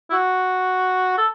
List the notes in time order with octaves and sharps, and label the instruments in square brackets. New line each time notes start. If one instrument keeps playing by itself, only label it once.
[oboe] E4
F#4
A4